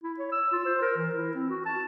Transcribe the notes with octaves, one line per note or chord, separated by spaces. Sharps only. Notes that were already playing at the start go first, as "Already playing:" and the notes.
E4
C#5
E6
F4
C5
A#4
E3
E4
C4
F#4
A5